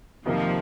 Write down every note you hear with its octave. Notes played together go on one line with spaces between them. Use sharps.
F2 C3 D#3 F3 G3 A#3